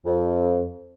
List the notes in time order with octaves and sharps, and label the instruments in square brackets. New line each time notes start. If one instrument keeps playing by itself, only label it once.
[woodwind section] F2